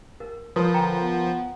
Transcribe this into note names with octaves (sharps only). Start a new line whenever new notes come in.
A#4
F3 A#4 B4 C#5 C6 D#6
D3 G5 A#5
B3